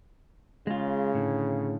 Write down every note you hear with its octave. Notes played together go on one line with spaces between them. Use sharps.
C#3 G#3 F4
A2 D3